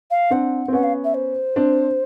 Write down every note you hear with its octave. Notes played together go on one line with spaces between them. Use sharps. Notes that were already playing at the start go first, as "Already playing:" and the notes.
F5
C4 D4 F#5
C4
B3 C#4 F#5
F5
E5
C5
C4 D4